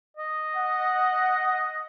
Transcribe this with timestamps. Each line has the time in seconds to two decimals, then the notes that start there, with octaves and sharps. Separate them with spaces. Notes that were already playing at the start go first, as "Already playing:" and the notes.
0.17 D#5
0.56 F#5